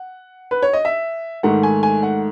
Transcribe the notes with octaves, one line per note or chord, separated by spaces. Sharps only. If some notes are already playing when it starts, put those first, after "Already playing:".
Already playing: F#5
B4
C#5
D#5
E5
G#2 D#3 A3 F#5
G#5
G#5
F#5